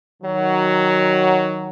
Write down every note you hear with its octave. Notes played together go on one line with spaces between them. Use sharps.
D#3 F#3